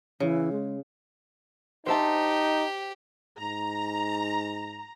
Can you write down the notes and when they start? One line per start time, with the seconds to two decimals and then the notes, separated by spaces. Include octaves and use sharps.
0.20 C#3 E3
0.52 G#3
1.86 D#4 G4 C5 E5 A5
3.39 G#2 A#5